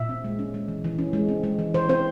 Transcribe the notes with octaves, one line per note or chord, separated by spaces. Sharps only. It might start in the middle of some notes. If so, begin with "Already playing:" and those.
Already playing: A#2 E5
C4
G#3
C#4
G#3
E3
E3
C#4
G#3
C4
G#3
E3
E3 C5
C4 C5